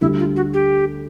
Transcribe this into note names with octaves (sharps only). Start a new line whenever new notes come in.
D2 D3 G3 E4
F4
F#4
G4